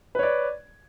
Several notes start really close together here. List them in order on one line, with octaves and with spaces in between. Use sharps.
B4 C#5 D5